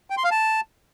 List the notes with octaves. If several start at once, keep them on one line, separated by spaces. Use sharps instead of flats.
G5
C6
F5
A5